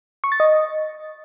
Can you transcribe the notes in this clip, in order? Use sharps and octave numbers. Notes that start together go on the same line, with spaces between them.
C#6
A6
D#5